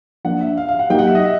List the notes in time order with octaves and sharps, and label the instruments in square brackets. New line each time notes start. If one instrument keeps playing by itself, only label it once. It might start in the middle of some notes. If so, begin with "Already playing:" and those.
[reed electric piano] F3 A#3 D4 [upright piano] F#5
[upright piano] E5
F5
F5
F#5
[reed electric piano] F#3 A#3 D#4 G4 [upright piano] G5
[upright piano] F#5
E5
D#5
E5